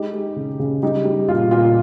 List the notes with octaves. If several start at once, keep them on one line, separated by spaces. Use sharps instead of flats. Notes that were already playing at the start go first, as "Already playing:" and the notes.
Already playing: G#3 D#4 G4
G#3
C#3
C#3
G3 D#4 G4
G3
A#2 F4
A#2 F4